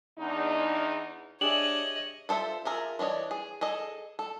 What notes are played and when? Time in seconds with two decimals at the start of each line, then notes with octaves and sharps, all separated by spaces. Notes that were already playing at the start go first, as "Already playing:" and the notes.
0.19 E2 D4 D#4
1.41 D4 G4 G#4 C#5 D#5 E5 F#7
2.29 F4 A4 C5 E5
2.65 F4 G#4 A#4 E5
2.99 E3 D4 C#5 D#5
3.31 G#4
3.61 G#4 A4 D#5
4.19 A4